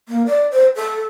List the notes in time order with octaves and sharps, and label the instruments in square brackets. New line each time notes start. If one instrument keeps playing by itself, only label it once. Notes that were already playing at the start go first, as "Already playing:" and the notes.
[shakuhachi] A#3
D5
C5
A4